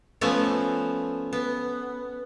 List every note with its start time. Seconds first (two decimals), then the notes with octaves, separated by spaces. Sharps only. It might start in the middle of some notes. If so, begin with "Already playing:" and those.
0.21 F3 A3 B3 C#4
1.33 B3